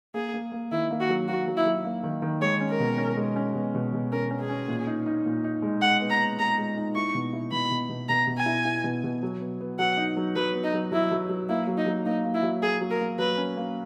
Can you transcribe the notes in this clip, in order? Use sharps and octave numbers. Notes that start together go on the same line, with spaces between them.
A#3 G#4
A#3
A#3
D#3 E4
A#3
F#4
F#3
A#3 F#4
F#3
E4
F#3
A#3
D#3
D#3
G#3 C#5
C#4
A#4
B2
C#4
G#3
C#4
B2
B2
B2
C#4 A#4
C#4
G#4
C#4
A#2
D#4
D#4
A#2
D#4
G#3
G#3 F#5
B3
A#5
B3
G#3 A#5
G#3
D#4
E4 C#6
B2
E4
B2 B5
B2
B2
B2 A#5
B2
G#5
E4
E4
B2
B2
F#3
B3
B3
F#3 F#5
D#4
F#3
F#3 B4
B3
D#4
F#3
F#3 E4
F#3
F#3
A#3 E4
F#3
D#4
F#3
A#3 D#4
A#3
E4
F#3
A#3 G#4
F#3
A#4
A#3
F#3 B4
C#4
A#3